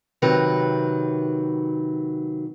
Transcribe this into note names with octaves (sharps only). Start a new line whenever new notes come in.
C3 D#3 F#3 B4